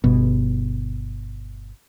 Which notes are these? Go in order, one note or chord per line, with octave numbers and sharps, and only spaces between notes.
G1 B2